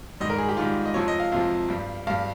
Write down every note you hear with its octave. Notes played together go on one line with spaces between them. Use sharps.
G#2 D#3 G3 D#5
A#4
G#4
G4
G#2 D#3 G3 F4
D#5
F2 C3 F3 C#5
D#5
F5
F2 C3 F3 F5
G2 G3
G2 G3 F5